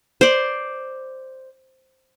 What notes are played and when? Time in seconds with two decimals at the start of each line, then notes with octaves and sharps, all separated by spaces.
0.21 C5 D5